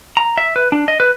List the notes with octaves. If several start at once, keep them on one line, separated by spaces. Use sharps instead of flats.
A#5
E5
B4
D4
D#5
B4